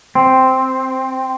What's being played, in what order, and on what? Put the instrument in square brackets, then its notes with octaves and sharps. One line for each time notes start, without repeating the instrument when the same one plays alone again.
[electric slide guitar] C4